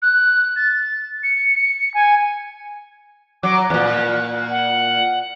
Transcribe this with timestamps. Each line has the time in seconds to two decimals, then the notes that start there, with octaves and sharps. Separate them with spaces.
0.02 F#6
0.56 A6
1.23 C#7
1.94 G#5
3.43 F#3 D6
3.70 E2 A#2 F#6
4.50 F#5